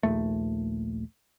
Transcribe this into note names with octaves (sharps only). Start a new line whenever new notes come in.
A#1 D#2 A3